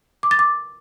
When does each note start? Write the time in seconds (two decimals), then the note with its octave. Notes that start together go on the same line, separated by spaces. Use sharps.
0.23 D6
0.31 A6
0.39 D6